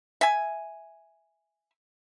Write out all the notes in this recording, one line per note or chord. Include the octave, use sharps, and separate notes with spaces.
E5 G#5